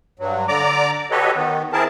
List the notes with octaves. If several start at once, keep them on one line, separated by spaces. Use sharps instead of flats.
G2 F#3
D3 D5 A#5 D6
F#4 G4 A4 B4 C#5 D#5
D#3 B3
C4 E4 G#4 A#4 A5